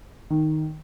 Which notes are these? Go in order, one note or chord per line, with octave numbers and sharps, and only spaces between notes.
D#3